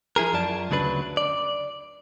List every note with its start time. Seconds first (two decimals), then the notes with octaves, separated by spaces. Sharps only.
0.16 F3 E4 G#4 A#4
0.33 F#2 F4 D5 A5
0.71 D2 C#3 F#3 D4 B4
1.17 D5